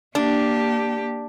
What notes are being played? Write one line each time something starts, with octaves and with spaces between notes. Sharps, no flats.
A#3 D4 G4